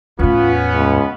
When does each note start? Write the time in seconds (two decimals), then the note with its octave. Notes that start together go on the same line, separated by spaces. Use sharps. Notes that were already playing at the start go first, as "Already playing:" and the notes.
0.19 E2 A2 B3 C#4 F4
0.73 C#2